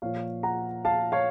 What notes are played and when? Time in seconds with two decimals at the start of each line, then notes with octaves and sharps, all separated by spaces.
0.02 A#2 F3 A#3 C#5 F5
0.43 F#5 A#5
0.85 F5 A5
1.12 C#5 F5